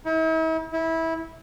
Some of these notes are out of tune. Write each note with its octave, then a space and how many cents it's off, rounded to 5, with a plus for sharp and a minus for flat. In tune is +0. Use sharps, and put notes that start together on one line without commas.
E4 -45
E4 -20